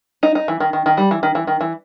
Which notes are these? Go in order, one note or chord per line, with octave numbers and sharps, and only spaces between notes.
D#4
D#4
E3
D#3
D#3
D#3
G3
E3
D#3
E3
D#3
E3